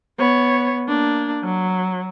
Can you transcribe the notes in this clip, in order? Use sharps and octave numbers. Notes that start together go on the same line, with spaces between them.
B3 C#5
A#3 D4
F#3